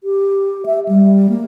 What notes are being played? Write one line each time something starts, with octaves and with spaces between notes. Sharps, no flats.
G4
E5
G3
A#3